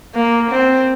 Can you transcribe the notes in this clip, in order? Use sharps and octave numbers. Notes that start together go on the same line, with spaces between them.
A#3
C4